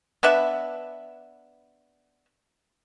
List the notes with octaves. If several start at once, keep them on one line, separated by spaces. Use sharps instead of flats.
B3 D4 B4 E5